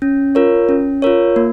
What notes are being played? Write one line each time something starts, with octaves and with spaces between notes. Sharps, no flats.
C#4
F4 A#4 C#5
C#4
F4 A#4 C#5
A#3